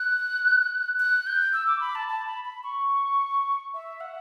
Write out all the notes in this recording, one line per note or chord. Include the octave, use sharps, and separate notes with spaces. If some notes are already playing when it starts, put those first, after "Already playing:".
Already playing: F#6
F#6
G6
E6
D6
B5
A5
A5
B5
B5
C#6
E5
F#5